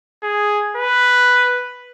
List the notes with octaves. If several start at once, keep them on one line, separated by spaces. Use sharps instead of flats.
G#4
B4